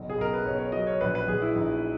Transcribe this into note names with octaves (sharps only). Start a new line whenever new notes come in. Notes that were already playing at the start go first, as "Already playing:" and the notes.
Already playing: F#1 B1
G#4
B1 A#4
B4
B1 C#5
C#5
F#3 D#5
C#5
A#1 B4
B4
A#1 G#4
E4
A#1 D#4